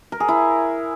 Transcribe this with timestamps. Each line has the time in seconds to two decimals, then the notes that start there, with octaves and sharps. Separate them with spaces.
0.12 A#4
0.20 G#4
0.28 E4